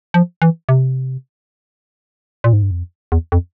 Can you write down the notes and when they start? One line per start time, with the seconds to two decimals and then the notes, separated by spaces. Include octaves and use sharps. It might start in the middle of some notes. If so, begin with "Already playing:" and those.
0.14 F3
0.42 E3
0.69 C3
2.44 A#2
2.53 G#2
2.62 G2
2.71 F2
3.12 E2
3.32 F2